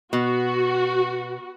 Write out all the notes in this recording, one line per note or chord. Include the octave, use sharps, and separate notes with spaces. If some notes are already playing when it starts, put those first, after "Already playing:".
B2 F#4